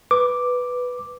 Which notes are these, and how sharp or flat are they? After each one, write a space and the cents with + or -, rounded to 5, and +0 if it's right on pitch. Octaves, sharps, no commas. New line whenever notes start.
B4 +0 D6 +0